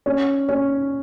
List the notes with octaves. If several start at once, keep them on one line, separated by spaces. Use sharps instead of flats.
C#4
C#4